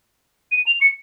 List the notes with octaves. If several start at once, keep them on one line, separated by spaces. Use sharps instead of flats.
D#7
F7
C#7